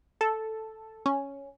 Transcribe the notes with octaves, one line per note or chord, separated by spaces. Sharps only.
A4
C#4